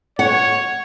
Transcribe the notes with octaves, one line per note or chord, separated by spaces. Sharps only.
C#5 F#5